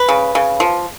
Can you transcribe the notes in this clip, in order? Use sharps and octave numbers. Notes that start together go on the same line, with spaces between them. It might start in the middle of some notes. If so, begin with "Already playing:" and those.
Already playing: B4
C#3
C#3
F3